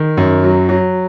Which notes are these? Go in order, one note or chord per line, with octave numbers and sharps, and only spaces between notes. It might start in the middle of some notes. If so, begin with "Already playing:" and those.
Already playing: D#3
F#2
F#3
F#3